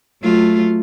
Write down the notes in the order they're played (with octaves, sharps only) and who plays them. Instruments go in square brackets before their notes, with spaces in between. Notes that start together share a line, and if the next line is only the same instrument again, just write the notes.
[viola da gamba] F#3 A3 F4